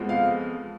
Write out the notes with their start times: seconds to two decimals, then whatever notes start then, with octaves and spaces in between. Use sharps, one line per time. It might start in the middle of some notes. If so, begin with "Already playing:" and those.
Already playing: F2 F3 G#3 B3
0.09 F5